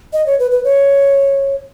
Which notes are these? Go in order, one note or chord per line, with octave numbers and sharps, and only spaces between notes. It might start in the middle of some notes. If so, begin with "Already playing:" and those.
D#5
C#5
B4
B4
C#5